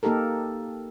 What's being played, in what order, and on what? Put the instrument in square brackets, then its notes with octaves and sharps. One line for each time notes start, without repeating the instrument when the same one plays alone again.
[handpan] A#3 D#4 G4 A4 A#4